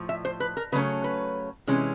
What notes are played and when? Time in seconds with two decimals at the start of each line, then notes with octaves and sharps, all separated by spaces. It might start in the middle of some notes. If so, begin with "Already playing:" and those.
Already playing: A2 F3
0.09 E5
0.25 C5
0.40 B4
0.57 A#4
0.72 C#3 F#3 A3 C#4 B4
1.04 B4
1.67 C3 E3 G#3 C#4